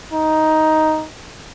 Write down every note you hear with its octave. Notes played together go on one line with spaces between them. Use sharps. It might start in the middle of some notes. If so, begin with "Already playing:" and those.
D#4